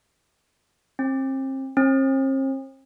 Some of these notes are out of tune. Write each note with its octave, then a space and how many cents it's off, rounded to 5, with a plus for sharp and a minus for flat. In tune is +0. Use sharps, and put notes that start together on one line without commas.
C4 +35
C4 +45